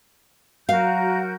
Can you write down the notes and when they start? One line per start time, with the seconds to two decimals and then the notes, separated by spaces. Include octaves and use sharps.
0.69 F#3 F#4 A#4 F5 G6